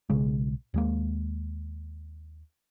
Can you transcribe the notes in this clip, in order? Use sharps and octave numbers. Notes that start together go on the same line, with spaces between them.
B1 C#3 G#3
D#2 G#3 A#3